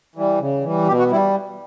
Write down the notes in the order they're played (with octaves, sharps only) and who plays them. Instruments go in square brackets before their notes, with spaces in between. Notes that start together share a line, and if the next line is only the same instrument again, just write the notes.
[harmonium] E3 G3
C#3
E3 G3
B2 G4
F#4
G3 E4